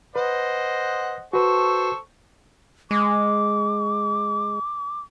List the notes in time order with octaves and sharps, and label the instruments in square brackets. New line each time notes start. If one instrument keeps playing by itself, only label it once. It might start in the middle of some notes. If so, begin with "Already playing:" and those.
[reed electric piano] B4 [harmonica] C5 D#5 F#5
[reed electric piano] F#4 B4 [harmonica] A4 C5 C#6
[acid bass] G#3 [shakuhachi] D6